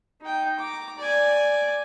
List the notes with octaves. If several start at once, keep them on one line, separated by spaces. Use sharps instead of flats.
D#4 G5
A#5 D6
D5 G#5